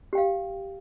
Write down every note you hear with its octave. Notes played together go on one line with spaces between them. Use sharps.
G4 F5 G5